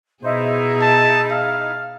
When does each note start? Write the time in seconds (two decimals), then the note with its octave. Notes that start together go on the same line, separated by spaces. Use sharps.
0.24 B2 D#4 E4 G#4 C5
0.82 A5
1.31 F5